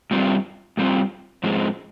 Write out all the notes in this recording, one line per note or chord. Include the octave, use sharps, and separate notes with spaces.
G2 G3 C4 F4
G2 G3 C4 F4
G#2 F3 G#3 C4